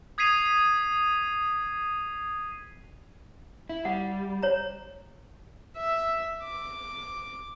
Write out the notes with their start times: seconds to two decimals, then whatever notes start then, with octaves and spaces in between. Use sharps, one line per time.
0.18 D#6 G#6 B6 C7 D#7 F7
3.69 E4
3.85 G3 F#5
4.43 C5 C#5 A#5
5.77 E5
6.44 D6